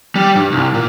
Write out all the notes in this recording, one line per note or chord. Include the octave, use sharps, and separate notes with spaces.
G3
G2
C2
A#2